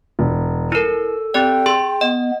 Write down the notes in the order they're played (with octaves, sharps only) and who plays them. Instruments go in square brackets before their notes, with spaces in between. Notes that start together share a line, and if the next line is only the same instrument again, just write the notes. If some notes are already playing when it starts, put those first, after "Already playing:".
[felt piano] E1
[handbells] E4 A#4 [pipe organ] A4 [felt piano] D#7
[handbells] C4 G4 D5 [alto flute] G5
[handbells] G#4 C6
[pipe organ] B3 [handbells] D#5